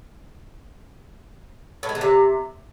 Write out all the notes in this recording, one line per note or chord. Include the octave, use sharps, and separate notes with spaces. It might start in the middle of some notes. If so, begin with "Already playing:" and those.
A2
G#3
D3
C3